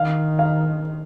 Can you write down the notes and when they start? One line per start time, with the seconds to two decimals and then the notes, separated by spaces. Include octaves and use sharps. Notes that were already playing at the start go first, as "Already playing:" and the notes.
Already playing: D#3 F5
0.39 F5